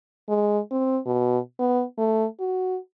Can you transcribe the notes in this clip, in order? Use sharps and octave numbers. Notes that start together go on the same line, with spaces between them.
G#3
C4
B2
B3
A3
F#4